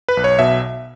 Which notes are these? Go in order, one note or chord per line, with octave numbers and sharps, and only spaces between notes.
B4
B1
C#5
B2 E5